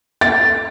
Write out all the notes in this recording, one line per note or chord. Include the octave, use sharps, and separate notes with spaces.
A6